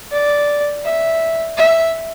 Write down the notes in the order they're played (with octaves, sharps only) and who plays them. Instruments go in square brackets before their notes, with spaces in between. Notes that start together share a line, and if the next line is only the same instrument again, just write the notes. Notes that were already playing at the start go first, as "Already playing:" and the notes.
[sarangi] D5
E5
E5